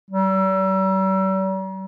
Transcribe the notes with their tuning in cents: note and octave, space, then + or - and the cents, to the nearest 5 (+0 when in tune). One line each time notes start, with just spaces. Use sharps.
G3 -45